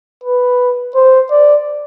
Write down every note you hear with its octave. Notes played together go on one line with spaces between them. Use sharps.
B4
C5
D5